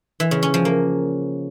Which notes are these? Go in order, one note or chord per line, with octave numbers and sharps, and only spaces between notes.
E3
C#3
C#4
F3
A#3